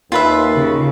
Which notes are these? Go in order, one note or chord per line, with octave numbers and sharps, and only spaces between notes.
D#2 F4 B4 E5
C#3